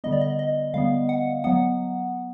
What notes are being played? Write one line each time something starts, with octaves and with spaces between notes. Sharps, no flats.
D3 G3 B3 D#5
D5
D#5
D#5
D3 G3 B3 F5
F#5
F#3 B3 F#5